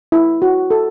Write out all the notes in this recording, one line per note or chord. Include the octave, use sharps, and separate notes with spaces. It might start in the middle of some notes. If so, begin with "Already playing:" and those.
E4
F#4
A4